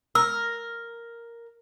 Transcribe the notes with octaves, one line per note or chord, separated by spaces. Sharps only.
A#4 E6